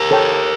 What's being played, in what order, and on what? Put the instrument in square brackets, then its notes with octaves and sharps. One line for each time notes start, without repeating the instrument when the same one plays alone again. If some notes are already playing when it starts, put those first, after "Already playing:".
Already playing: [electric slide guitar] G4 A#4
[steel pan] A4 C#5 G5